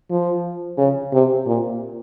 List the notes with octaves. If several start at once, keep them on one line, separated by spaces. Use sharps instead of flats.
F3
C#3
C3
A#2